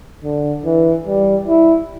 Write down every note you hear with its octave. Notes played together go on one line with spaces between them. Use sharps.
D3
E3
G3
E4